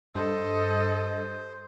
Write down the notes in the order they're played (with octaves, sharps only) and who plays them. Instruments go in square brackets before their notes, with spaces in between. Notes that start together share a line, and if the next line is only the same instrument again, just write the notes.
[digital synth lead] G2 [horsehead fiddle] A4 D#5 [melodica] C5